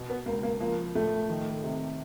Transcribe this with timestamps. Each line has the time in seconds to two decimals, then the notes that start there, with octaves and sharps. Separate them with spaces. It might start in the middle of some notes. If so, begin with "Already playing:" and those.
Already playing: B2
0.10 B3
0.26 C#2 A#3
0.43 A#3
0.60 F3 A#3
0.95 A2 A3
1.29 D#3
1.64 C3